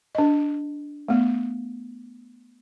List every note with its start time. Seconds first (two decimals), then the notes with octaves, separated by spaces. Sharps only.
0.15 D4 D#5
1.08 A3 B3